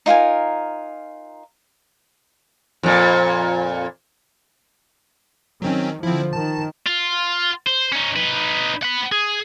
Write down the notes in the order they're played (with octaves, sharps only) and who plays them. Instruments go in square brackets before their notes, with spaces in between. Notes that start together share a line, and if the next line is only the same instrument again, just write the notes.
[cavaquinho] D#4 F4 A#4 G#5
[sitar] F2 A#2
[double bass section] D#3 [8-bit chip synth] F#3 C4 C#4
[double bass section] D3 F3 [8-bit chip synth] C4 E4
[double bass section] D#3 [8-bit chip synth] A5
[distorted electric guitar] F4
C5
C#4 D#4
D#4 B4
F#5 B5
G#4